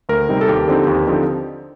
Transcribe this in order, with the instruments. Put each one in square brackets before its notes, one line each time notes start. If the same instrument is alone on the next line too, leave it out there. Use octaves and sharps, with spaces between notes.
[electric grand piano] D2 A#4
C3 G3 C4 D#4
A4
D#2 G4
D3 F3 C4 D#4
D#2
D3 F3 C4 D#4